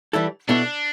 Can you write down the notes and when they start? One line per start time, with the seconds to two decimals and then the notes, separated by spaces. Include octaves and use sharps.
0.13 E3 G3 E4 A4
0.49 B2 B3 D4 E4 A4